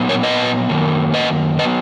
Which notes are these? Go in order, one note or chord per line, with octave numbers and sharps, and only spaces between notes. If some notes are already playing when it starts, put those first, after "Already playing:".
Already playing: A#2 F#3 B3
A#4 C#5
B4 D#5
F#2 D#3 F#3 A#3
B4 D#5
F#3 B3 B4 D#5